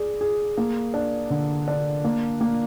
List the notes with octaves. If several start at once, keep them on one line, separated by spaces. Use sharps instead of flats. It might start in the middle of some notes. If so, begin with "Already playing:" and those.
Already playing: G#4 D5
G#4
A#3
D4
D3
D4
A#3
A#3